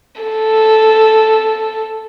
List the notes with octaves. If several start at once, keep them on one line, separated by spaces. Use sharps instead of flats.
A4